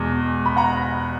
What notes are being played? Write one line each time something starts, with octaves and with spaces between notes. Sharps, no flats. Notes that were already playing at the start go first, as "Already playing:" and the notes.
Already playing: E2 B2 G#3
B5
F#5 A#5